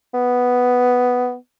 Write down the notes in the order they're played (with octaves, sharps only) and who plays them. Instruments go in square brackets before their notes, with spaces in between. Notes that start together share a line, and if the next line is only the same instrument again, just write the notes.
[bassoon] B3